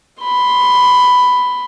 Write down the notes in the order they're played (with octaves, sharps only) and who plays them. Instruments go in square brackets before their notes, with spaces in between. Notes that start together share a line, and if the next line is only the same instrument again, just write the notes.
[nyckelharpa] B5 C6